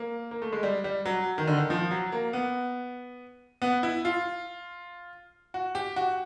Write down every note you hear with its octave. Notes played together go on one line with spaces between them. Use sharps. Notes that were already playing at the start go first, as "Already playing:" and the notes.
Already playing: A#3
A#3
A3
G#3
G3
G3
F#3
D#3
D3
D#3
F3
F#3
A#3
B3
B3
E4
F4
F#4
G4
F#4